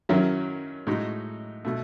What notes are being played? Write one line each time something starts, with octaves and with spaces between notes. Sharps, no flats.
F#2 D#3 F#3 C#4 E4
A2 G#3 D#4 F#4
B2 A3